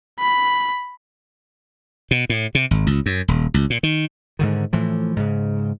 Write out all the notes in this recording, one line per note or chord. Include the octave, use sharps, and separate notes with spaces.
B5
B2
A2
C3
G#1
C#2
F#2
D#1
C#2
A#2
D#3
G#2 D3 D#3
A2 E3 F3
G#2 C#3